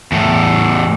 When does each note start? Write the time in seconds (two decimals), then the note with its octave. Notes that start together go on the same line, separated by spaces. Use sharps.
0.12 E2 A2